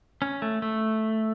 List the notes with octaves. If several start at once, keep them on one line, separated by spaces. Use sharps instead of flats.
C#4
A3
A3